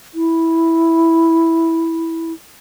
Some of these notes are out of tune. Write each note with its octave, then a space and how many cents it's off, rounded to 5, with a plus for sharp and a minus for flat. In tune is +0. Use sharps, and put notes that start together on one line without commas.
E4 -5